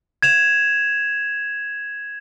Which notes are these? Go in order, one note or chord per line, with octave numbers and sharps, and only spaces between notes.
G#6 E7 F7